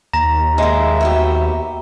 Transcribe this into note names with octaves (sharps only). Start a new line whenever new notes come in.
D#2 A#5 A#6
G#3 A#3 E5
B3 F#4 G4